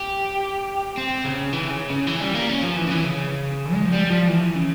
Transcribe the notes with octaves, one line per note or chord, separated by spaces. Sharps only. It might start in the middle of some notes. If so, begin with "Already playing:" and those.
Already playing: G4
C4
C#3
E3
C#3
C#3
E3
G3
A#3
C#4
F3
E3
C#3
E3
C#3
G#3
F3
G3
F3
E3
C#3